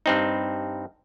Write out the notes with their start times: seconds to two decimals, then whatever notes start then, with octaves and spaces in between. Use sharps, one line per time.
0.06 G2 C4 D#4